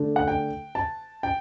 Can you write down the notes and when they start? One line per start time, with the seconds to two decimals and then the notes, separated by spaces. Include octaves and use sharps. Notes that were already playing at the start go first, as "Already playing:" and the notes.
Already playing: D3 A3 D4
0.16 F#5
0.28 G5
0.75 A5
1.23 G5